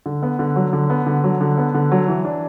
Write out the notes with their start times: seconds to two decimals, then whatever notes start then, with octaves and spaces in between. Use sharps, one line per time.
0.06 D3
0.23 B3
0.39 D3
0.56 F#3
0.73 D3
0.90 B3
1.07 D3
1.24 F#3
1.41 D3
1.57 B3
1.75 D3
1.92 F#3
2.08 E3
2.25 D4